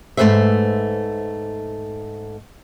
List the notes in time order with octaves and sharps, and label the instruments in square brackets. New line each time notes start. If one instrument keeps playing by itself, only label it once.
[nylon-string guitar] G#2 A3 G#4 B4 C5 E5